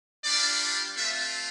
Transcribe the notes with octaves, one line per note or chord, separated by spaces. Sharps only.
G3 D4 F4 D5
A3 C4 F4 E5